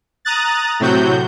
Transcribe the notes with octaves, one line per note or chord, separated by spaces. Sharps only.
A#5 D#6 F#6 A6
A2 C3 F#3 F#4 G6